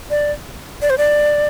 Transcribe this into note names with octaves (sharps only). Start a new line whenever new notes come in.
D5
D5
C5
D5